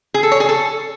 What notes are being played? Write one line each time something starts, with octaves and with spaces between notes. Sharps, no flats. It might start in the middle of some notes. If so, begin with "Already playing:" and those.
G#4
A4
C#5
G#4
A4